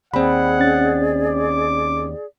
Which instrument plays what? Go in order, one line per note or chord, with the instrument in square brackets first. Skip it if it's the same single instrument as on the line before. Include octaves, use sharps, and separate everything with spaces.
[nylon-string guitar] D#2 C4 [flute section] G#4 D5 [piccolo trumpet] F#5 [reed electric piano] B5
[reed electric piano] C#4 A6
[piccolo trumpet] D6